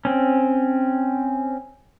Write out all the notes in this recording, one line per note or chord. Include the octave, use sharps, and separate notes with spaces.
C4 C#4